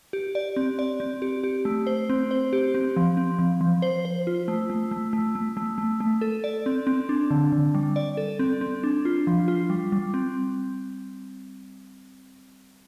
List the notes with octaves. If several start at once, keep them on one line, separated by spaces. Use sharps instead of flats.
G4
D5
C4
D5
C4
G4
G4
A3
C5
C4
C5
G4
C4
F3
C4
F3
F3
C5
C5
F4
A3
A3
A3
A3
A3
A3
A3
A3
A4
D5
C4
C4
D4
D3
D3
G3
D5
A4
C4
C4
D4
F4
F3
F4
G3
G3
C4